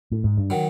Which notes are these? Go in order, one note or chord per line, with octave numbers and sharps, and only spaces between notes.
A2
G#2
G2
D#3 F#3